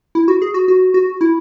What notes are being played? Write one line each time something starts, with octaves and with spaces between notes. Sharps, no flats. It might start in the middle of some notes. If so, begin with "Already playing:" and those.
E4
F#4
G#4
F#4
F#4
F#4
E4